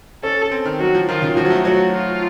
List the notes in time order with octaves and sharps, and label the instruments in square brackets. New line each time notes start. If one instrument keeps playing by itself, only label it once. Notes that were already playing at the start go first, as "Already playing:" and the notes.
[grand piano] C#4 [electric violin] A4
[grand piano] C4
D#3
[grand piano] F#3 [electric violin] F#4
[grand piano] F3
[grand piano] D#3 [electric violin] F4
[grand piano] C#3
[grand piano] F3 [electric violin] F#4
[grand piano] F#3
A3
[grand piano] F#3 [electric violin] F#4
[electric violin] F4